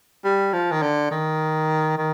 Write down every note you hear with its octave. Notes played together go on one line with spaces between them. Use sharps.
G3
F3
D#3
D3
D#3
D#3